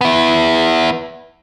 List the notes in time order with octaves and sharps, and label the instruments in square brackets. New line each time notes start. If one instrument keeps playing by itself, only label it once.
[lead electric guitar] B3 E4